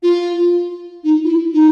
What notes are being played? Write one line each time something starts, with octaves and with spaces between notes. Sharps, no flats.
F4
D#4
F4
E4
D#4